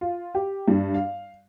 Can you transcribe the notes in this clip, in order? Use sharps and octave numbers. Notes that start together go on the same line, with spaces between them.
F4
G4
G2
F5